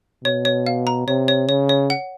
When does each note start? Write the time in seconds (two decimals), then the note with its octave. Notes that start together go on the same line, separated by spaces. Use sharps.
0.24 B2 C#5
0.45 C#5
0.66 F5
0.87 A#5
1.07 C3 C#5
1.28 C#5
1.49 C#3 C#5
1.69 C#5
1.90 F#5